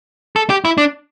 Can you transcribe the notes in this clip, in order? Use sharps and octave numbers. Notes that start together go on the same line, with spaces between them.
A4
G4
E4
D4